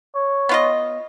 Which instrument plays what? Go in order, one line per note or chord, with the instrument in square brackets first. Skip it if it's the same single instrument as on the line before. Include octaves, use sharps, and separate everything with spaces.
[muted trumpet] C#5
[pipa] B3 F4 D#5